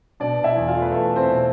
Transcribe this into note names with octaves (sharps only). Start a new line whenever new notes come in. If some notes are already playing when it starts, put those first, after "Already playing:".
B2 D4 D5
B2
E4 E5
E2
F4 F5
A3
B4
E2 A3 A4
E2
C4 C5
B2